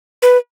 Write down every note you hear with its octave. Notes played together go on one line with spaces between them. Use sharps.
B4